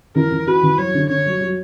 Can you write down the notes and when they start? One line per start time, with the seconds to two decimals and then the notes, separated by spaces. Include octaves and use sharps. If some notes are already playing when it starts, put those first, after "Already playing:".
0.15 E3 A#4
0.31 E3
0.47 F#4 B4
0.63 E3
0.78 F#3 C#5
0.94 D3
1.09 D3 C#5
1.26 F#3
1.41 F#3